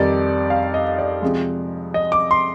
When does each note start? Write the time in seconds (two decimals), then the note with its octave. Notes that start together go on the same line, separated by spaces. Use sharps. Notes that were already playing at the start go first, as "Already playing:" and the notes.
Already playing: F2 D#3 G3 D5
0.50 F5
0.74 D#5
0.99 D5
1.22 C3 F3 G#3
1.94 D#5
2.12 D6
2.31 C6